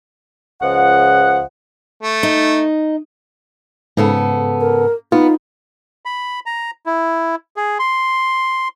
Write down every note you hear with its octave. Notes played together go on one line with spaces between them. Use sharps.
C#2 C#3 F3 D#5 F#5
A3
D#4
G#2 C#3 B3 A4
A#4
B3 D#4 F4
B5
A#5
E4
G#4
C6